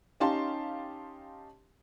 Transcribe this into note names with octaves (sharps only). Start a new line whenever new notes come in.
C#4 D#4 G4 F5 A5 C6